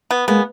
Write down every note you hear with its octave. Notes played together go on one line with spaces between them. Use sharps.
B3
G#3 A#3 B3